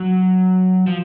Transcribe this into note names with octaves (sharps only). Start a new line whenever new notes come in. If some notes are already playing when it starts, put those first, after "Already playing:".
Already playing: F#3
F3